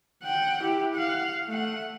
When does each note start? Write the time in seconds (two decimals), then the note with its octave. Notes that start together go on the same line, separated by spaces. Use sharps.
0.24 F#5 G5
0.63 E4 G4
0.94 F5 F#5
1.48 A3 F#5